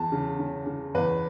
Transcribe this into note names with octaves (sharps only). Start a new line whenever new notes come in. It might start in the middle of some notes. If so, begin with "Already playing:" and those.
Already playing: E2 A5
C#3
C#3
C#3
E2 B4